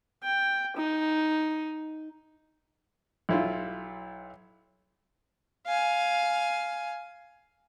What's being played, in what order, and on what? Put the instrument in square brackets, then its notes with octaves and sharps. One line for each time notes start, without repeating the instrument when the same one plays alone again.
[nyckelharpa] G5
D#4
[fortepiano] B1 E4 F4
[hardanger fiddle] F5 G#5